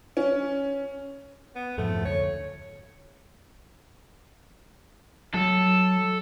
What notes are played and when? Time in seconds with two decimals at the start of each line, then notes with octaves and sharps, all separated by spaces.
0.17 C#4
1.55 B3
1.78 F2 G#2 F3 A3
2.05 D2 C#5
5.34 F#3 A4